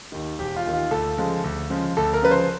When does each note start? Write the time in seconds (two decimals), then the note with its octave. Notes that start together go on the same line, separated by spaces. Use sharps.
0.12 D#2 D#3
0.39 E1 G4
0.56 F4
0.66 D#2 D#3
0.74 F4
0.91 D2 A4
1.17 C#3 F3 G#3
1.44 D2
1.70 C#3 F3 G#3
1.97 D2 A4
2.14 A#4
2.22 C#3 F3 G#3 B4
2.31 C5